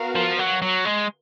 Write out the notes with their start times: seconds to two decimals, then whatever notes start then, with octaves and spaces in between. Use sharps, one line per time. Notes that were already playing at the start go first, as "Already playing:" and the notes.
Already playing: B3 F#4 A#4 F5
0.15 F3
0.39 F#3
0.62 F#3
0.85 G#3